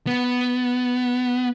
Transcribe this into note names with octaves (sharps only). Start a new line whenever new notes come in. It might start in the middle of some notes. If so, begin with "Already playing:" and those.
B3